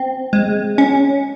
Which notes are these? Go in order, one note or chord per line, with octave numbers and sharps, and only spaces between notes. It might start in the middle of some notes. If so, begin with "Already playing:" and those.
Already playing: C4
G#3
C#4